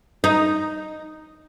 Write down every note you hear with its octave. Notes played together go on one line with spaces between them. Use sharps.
D#4